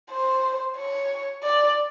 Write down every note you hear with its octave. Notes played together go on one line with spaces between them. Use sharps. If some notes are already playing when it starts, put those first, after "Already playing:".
C5
C#5
D5